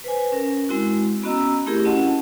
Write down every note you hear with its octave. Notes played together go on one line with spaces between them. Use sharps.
B4 C5 G#5
C#4 A#4
G#3 C4 E4 F#4
B3 C#4 F#4 D#5 A#5 E6
A3 C4 E4 G4 G#4 A#4
C#4 E4 F#4 D#5 F#5 A5